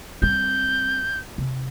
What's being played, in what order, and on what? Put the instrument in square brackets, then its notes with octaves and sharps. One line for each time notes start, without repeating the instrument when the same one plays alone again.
[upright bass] G3 C4 [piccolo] G6
[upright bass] C3